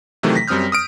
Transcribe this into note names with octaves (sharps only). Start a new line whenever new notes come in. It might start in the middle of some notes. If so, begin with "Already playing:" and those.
C3 D#3 E3 F#3 A3
A#6 B6
F#2 G3 C4 D#6 F6 G6
D#6 F6 D7